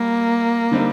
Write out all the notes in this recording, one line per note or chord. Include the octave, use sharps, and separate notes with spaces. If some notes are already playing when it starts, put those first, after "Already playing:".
Already playing: G3 A#3
D3 G3 C4 D#4